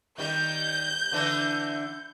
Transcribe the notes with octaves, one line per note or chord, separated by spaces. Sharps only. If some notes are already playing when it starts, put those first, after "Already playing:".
D#3 G3 G6
D3 E3 D4